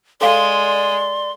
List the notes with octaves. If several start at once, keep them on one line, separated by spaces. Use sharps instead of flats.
G#3 A4 D5 F5 C6